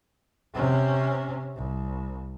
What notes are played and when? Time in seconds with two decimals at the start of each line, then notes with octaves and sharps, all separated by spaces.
0.54 C3 C#4
1.56 C2